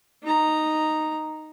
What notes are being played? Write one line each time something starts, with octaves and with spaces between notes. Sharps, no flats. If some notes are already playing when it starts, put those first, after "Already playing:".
D#4 A#5